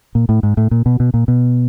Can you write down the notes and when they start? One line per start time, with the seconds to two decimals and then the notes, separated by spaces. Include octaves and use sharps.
0.15 A#2
0.29 A2
0.43 G#2
0.57 A2
0.71 A#2
0.86 B2
1.00 B2
1.14 A#2
1.28 B2